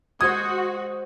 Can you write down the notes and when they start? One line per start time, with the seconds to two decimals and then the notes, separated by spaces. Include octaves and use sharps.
0.21 G#3 F#4 C5 D#6 G#6